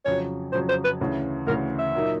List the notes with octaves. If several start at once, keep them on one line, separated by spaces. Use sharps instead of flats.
F2 C#3 F#3 C#5
F2 C#3 F#3 C5
C5
B4
D2 C#3 E3
D2 C#3 E3 A#4
E5
A#2 F#3 A#3 D#4